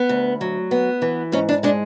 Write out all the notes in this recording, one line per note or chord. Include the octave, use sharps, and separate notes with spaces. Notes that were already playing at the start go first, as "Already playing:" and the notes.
Already playing: B3
D2
F#3
B3
E3
G#2 C#4
D4
G#3 D4